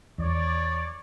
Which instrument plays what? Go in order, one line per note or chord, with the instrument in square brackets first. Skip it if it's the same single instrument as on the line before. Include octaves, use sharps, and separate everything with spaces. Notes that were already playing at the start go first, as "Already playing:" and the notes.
[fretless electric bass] E2 [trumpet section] C#5 D5